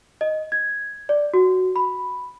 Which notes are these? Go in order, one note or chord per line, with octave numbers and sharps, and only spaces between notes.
D#5
G#6
D5
F#4
B5